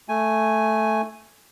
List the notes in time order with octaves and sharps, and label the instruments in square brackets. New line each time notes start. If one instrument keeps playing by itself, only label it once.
[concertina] A3 G#5